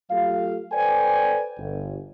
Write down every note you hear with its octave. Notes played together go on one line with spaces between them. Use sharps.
F#3 A3 F4 G4 A4 F5
A4 B4 C5 D5 G5 G#5
G1